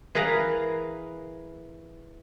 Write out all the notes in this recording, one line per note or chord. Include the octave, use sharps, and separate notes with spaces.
E3 G#4 A#4 B4 F5 A#5